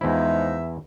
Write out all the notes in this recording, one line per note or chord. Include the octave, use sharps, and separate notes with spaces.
E2 F3 G#3 D#4 E4 E5